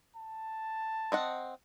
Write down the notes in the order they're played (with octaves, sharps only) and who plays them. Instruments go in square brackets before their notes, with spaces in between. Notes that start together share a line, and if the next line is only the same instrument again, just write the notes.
[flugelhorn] A5
[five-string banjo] C4 D#5 F#5